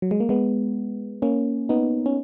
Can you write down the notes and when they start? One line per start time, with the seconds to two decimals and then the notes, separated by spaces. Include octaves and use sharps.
0.02 F#3
0.11 G#3
0.20 A#3
0.29 G#3 B3
1.22 A#3 C#4
1.69 B3 D#4
2.06 C#4